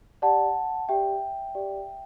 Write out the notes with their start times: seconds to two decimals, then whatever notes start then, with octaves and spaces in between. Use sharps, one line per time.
0.22 G4 D5 F#5 A5
0.89 G4 D5 E5 G5
1.55 G4 D5